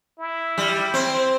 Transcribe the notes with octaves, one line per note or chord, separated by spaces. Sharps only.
E4
G3
C4